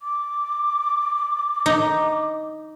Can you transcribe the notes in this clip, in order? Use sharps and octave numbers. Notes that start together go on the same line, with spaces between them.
D6
D#4